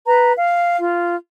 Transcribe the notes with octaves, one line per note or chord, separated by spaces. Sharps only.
B4 A#5
F5
F4